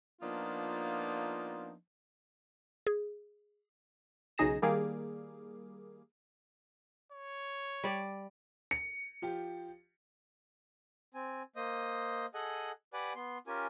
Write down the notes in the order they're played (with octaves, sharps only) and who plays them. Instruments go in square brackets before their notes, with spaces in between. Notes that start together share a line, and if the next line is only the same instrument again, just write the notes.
[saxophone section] F3 A#3 B3 D4 D#4 F4
[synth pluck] G#4
[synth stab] B1 C#3 D#4 G#4 A#6 E7
D#3 G3 A#3 G#4 F5 D6
[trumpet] C#5
[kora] G3 D5
[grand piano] C#7
[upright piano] F3 F4 G4
[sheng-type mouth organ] C4 G#5
A#3 C5 D#5 D#6
G#4 A4 D#5 F#5 G#5
G4 B4 D5 F#5 G#5
B3 C6
C#4 F4 G4 A#4 G#5